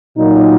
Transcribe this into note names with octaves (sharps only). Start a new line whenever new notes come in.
A#2 F#3 D#4